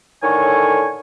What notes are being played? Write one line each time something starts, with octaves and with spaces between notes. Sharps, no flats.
A2 D3 D#3 C#5 G#5 C#6